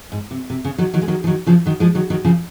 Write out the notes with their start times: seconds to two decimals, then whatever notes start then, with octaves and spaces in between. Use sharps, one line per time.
0.12 G#2
0.31 C3
0.50 C3
0.65 C#3
0.78 D#3 F#3
0.94 D#3 F#3
1.02 G#3
1.08 D#3 F#3
1.24 F3
1.27 D#3 F#3
1.47 C#3 F3
1.66 D#3 F#3
1.80 F3 G#3
1.95 D#3 F#3
2.10 D#3 F#3
2.24 C#3 F3